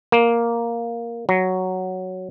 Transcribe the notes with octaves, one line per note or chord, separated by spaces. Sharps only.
A#3
F#3